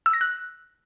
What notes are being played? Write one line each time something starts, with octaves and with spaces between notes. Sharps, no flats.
E6
A#6
F#6